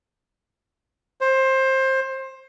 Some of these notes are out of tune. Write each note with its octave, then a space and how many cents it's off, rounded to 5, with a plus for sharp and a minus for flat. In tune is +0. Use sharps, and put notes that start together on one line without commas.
C5 +20